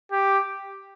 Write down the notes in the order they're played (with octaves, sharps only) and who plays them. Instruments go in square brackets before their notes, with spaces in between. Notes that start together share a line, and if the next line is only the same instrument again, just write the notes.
[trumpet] G4